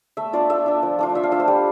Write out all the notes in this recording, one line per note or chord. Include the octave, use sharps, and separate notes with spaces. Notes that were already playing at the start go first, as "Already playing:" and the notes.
A3 E5
D4 F4 D5
A3 E5
D4 F4
F3
A3 D4 F4
F3 E5
F5
A3 D4 F4 E5
C5
G3